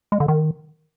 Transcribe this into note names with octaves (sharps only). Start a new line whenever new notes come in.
G#3
D3
D#3